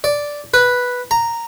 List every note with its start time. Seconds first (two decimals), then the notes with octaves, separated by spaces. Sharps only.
0.04 D5
0.54 B4
1.11 A#5